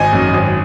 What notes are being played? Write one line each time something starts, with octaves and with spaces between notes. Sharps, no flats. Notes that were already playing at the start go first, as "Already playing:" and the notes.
Already playing: G#1 D#5 G#5
F#2
G#1